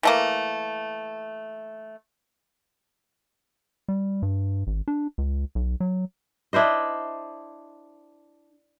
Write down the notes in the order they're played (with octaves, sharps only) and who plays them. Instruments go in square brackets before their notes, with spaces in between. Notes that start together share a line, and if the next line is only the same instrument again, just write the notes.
[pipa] E3 A3 A#3
[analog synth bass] G3
G2
G#1
D4
C#2
B1
F#3
[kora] D4 E4 C5 D#5